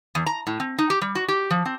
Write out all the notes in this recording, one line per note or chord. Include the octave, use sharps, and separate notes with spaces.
E2
A#5
A2
C4
D#4
G4
G3
F#4
G4
F3
C4